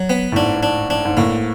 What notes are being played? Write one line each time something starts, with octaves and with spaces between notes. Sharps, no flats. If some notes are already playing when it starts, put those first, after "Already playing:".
Already playing: F#3
B3
A2
G#2 D4
D4
D4
G#2
A2 A#3